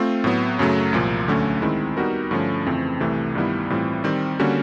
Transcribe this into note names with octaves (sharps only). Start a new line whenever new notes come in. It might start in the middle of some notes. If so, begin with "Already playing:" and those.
Already playing: A3 C4 F4
A2 F#3 B3
F#2 C#3 F#3 A3
C2 A#2 F3 A#3
D2 D3 F#3 A3 C#4
D#3 G#3 C4 E4
G3 B3 D#4 F#4 A#4
G2 D3 F3 A3 C#4
F2 C#3 E3 A3 C4
C2 C3 E3 A3
G2 D#3 G3 B3 E4
A2 E3 G3 C4 F4
D#3 G3 C4
D3 G3 A#3 C#4 F#4